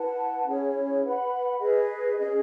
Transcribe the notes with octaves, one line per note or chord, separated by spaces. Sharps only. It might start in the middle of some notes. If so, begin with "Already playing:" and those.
Already playing: E4 B4 F#5 A5
C#4 E4 G#4 C#5
B4 F#5 B5
G#4 B4 D#5
C#4 G#4 D#5